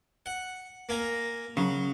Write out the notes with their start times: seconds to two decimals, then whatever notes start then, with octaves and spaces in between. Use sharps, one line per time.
0.26 F#5
0.89 A#3 G#5 A#5
1.57 C#3 F#3